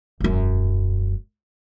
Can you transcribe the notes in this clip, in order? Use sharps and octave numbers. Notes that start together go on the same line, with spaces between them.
E1 F#2